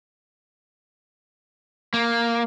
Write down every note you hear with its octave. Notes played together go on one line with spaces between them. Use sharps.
A#3